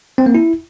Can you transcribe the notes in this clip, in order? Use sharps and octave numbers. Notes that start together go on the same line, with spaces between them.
C4
A#3
E4